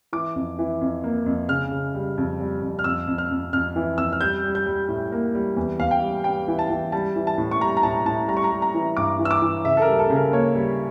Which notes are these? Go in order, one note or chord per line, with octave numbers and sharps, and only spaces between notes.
E3 D6
F2
E3
F2
A#3
F2
C#3 F6
C#3
G3
F2
G3
F2
F6
F2 E6
F2
F6
F2
F2 F6
E3
F2 E6
F6
G3 G6
G3
G6
G3
A2
A#3
G3
E2
E2 F5
G5
G3
G3 G5
E3
A5
E3
G3 A5
E3
A5
A2
C#6
G3 A#5
A#5
A2 A5
A2 A5
G3 A#5
C#6
A#5
G3
A#5
E3
G2 D6
E3
E6
D6
E3
C#3 E5
A4
A#4
G3
A4
C#3
A#4
A#3 C#5
G3